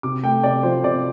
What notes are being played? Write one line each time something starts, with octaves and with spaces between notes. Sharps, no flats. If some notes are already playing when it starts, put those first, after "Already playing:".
C3 D6
A3 G5
C3 D5
F3 C5
C3 D5